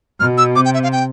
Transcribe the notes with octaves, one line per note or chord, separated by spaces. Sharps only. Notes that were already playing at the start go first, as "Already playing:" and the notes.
B2 F6
E6
C3 D6
G5
E5
F5
G5